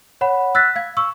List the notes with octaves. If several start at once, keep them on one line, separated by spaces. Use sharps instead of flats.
C#5 F#5 B5
E6 F#6 A6 B6
F5 G#6
C#6 E6